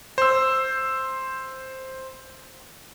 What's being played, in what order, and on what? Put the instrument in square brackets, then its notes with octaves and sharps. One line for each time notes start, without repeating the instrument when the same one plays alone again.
[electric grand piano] C5 E6